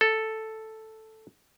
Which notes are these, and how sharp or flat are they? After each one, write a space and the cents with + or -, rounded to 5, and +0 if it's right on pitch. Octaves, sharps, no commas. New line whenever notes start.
A4 +0